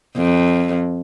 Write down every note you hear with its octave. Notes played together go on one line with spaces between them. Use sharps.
F2